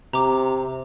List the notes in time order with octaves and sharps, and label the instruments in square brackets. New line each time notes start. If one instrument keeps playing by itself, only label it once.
[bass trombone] C3 [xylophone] A#5 D6